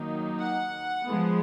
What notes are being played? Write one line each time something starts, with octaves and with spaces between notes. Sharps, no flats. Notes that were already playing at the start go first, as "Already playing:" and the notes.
Already playing: D#3 F#3 A#3 D#4
F#5
F3 G#3 B3